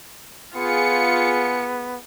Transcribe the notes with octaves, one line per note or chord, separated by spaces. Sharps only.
B3 F4 G#4 C#7